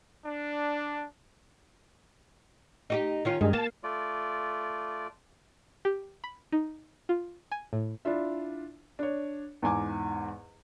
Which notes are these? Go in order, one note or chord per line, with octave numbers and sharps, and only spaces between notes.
D4
D#4 F#4 G4
D#3 C#4 F4
G2 D#3 G#3
A#3 A5
A3 F4 D5
G4
B5
D#4
F4
G#5
A2
D4 E4 F4 E5
D4 C#5
E2 G#2 G#5 D6